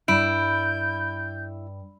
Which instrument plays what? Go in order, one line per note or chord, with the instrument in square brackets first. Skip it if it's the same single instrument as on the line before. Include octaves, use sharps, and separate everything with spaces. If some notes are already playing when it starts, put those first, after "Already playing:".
[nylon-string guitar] G2 [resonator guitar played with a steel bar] E4 [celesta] B5 D7 [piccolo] G6